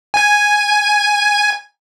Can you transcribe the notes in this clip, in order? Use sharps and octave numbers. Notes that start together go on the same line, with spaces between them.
G#5 G#6